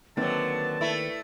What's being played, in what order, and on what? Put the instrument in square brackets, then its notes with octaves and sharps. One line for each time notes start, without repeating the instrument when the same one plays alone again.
[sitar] D3 F#3 [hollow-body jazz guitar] D#3 A#3 C4 [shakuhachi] B4 [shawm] A5
[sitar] A3 E4